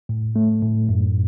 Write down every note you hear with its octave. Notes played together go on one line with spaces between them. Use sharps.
A2
A3
A2
F#2